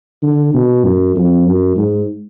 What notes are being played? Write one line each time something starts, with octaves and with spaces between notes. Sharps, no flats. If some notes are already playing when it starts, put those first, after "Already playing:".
D3
B2
F#2
F2
F#2
G#2